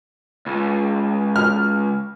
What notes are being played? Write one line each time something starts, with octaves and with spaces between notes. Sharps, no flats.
C#2
F6